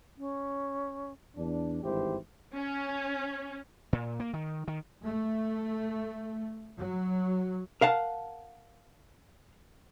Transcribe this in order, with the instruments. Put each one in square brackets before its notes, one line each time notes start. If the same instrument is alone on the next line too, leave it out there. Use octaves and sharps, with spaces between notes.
[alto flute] C#4
[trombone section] E2 D4
G#1 G2 E3 E4 G4 C5
[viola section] C#4
[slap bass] A#2
A#3
D#3
D#3
[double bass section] A3
F#3
[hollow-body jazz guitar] A#4 F5 F#5 A5